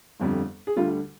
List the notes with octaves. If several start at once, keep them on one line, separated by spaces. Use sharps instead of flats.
G1 F2 D3 G3
G#4
D2 D3 G3 F4